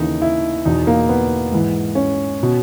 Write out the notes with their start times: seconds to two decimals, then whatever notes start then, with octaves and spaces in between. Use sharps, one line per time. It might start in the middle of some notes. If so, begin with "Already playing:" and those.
Already playing: D#2 C#3 E3 D#4
0.22 E4
0.65 E2 B2 D#4
0.87 A#3
1.09 B3
1.52 G#2 E3
1.95 C#4
2.43 B2